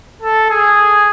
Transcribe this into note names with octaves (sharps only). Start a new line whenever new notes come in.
A4
G#4